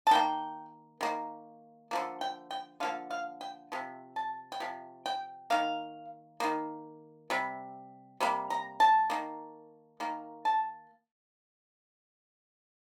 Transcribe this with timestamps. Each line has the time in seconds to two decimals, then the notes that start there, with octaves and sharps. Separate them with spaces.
0.07 A5
0.11 D#3 A#3 G5
1.01 D#3 A#3
1.91 D3 F3 A#3
2.21 G5
2.51 G5
2.80 D3 F3 A#3 F5
3.10 F5
3.41 G5
3.72 C3 F3
4.16 A5
4.52 G5
4.60 C3 F3
5.06 G5
5.50 D#3 A#3 F5
6.40 D#3 A#3
7.30 C3 G3
8.20 C3 G3 A#3
8.50 A#5
8.80 A5
9.10 D#3 A#3
10.00 D#3 A#3
10.45 A5